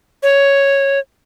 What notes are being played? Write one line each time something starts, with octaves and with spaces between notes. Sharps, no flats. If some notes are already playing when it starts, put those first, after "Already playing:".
C#5